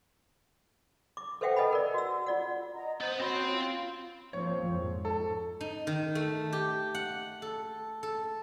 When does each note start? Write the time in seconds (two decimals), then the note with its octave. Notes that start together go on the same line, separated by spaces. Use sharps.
1.17 D6
1.41 A4 B4 C5 E5 F#5 G5
1.56 A4 B4 D#5 F#5 G#5 B5
1.72 A#4 D5
1.94 F#4 E6
2.26 F4 D5 F#5
2.74 D#5 A#5
3.00 B3 C5 G6
3.20 C4 F#4 C#5 B5 C6
3.51 F4
4.33 F3 A#3 C4 C#5
4.67 F2 G#2
5.05 A4
5.61 D#4
5.87 D#3
6.15 A3
6.53 G4
6.95 F#5
7.42 A4
8.03 A4